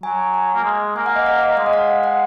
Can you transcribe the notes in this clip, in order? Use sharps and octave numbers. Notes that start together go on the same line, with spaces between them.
F#3 G#5
G#5
A#3
G#3
A#3 G#5
F#5
D#5
F5
D#5
F5
G#3 D#5
F#5
F5
F5
F#5